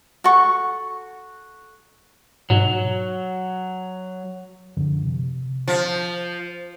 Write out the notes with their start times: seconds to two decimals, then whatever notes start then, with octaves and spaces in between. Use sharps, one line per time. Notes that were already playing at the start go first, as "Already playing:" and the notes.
0.24 F#4 A4 C#6
2.50 G#2 B2 F#3
4.77 F#2 D3 F3
5.04 C3
5.68 F3